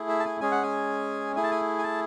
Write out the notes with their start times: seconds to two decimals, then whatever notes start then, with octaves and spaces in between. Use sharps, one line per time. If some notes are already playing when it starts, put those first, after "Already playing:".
Already playing: A3 E4 G#4
0.09 E5
0.20 A5
0.25 G#5
0.41 G#3 C#4 G#4 G#5
0.52 F#5
0.63 G#5
1.36 A3 E4 G#4 G#5
1.43 A5
1.51 G#5
1.79 G#5
1.84 A5